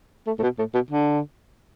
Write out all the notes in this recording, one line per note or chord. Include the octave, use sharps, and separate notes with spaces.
A3
A2
B2
A2
B2
D3